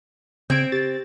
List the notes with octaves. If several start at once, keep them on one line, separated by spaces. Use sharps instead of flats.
C#3 C4 G#6 D7
G4 A6